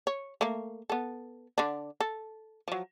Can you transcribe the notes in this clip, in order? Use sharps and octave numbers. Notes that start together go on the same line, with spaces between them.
C#5
A3 A#3
B3 A4
D3 D4
A4
F3 F#3